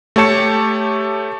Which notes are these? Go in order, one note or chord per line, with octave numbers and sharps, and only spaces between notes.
A3 G4 C#5 A5 C#7